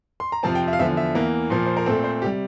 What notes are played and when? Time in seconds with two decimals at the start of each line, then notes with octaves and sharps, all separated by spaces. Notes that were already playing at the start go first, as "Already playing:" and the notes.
0.20 C6
0.32 A#5
0.43 F2 C3 F3 C4 A5
0.55 G5
0.68 E5
0.73 F5
0.79 E2 D3 F3 E5
0.97 E5
1.15 E2 E3 A#3
1.50 A#2 F3 A#3
1.66 C5
1.77 A#4
1.86 A#2 A3 C4 A4
2.04 C5
2.22 C3 G3 G4